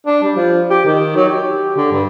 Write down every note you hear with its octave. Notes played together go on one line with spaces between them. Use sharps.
D4
G3
F3
G4
D#3
F#3
G4
D3
G2